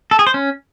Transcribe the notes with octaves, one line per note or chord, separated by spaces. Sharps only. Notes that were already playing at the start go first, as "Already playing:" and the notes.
A4
G#4
C5
C#4